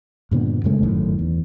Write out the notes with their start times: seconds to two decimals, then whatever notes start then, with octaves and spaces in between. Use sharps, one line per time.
0.31 G2 A#2 D3 B3
0.64 F#2 C#3 G#3 A3
0.83 G1 F#2 A2 D#3
1.19 E2